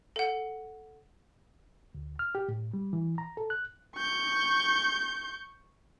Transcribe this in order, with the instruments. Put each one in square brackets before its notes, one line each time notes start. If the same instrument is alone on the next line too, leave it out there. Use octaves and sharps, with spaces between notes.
[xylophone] A4 F#5
[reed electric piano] D2
F6
G4
A2
G3
E3
A#5
A4
F#6
[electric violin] C#6 G6